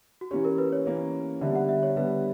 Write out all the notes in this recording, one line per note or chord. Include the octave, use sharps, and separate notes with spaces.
F#4
E3 A#3 C#4 G4
A#4
B4
C#5
E3 A#3 C#4
D3 G3 B3 E5
F#5
E5
C#5
D3 G3 B3 B4